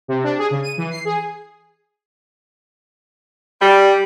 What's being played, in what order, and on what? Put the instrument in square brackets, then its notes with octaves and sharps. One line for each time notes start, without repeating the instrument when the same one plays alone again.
[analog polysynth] C3
D4
G#4
C#3
D#7
E3
C7
G#4
[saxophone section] G3